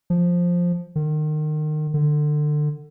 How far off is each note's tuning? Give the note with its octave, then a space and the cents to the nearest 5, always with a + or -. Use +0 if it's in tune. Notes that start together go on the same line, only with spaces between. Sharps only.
F3 +5
D#3 -30
D3 +25